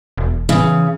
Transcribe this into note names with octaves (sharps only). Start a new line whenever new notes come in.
E1
C#3 E3